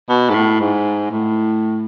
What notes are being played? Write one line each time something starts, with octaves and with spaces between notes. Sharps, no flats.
B2
G#2
A2
G#2
A2